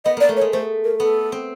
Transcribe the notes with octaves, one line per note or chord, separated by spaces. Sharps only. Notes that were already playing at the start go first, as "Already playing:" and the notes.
B3 D#5
A#3 D5
A3
C#5
G#3
A3 C5
A#4
B3 A4
C4